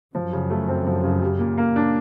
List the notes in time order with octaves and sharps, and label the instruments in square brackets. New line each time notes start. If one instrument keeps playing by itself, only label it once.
[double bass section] F#2 [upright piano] F3
[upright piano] C#3
A3
C4
F3
C#3
G3
A#2
A#3
D4